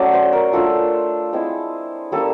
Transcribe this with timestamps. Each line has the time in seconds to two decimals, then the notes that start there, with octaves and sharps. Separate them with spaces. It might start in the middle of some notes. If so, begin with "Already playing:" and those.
Already playing: F#3 A3 C#4 D5
0.13 C5
0.33 A#4
0.53 A3 D4 F4 A4
1.33 G#3 C4 E4
2.12 G3 A#3 C#4 A4